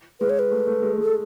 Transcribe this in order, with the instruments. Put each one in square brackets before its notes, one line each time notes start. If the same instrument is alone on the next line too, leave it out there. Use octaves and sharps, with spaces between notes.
[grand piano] G#3 [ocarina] B4
[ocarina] C#5
B4
[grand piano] A3
A3
G#3
G#3
[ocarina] A4